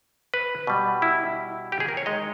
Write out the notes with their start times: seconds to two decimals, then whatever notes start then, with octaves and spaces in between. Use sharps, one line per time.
0.34 B4
0.67 B2 G3
1.02 E4
1.72 G4
1.80 G#4
1.88 A#4
1.97 C#5
2.06 D#3 G#3 D#5